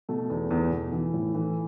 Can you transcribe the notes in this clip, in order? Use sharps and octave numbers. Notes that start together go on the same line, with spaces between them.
B2 A3
E2
E2
B2
E3
A2
E3